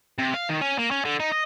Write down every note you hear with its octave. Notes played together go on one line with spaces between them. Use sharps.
C3
F5
D#3
C#4
A#3
C#4
D3
D#4
D#5